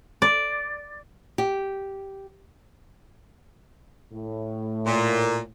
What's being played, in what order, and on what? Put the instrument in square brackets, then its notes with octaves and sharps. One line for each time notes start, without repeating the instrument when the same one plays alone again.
[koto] D5
[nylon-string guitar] G4
[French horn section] A2
[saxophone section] A#2